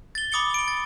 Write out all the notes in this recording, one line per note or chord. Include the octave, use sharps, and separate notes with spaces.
A6 G7
B5 D6 D#6 A6 C#7 G7
D7 G7
A6